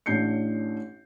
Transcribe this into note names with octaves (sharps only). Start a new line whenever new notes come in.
A1 A2 D4 G6 C7 C#7